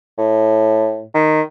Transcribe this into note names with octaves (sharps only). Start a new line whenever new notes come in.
A2
D#3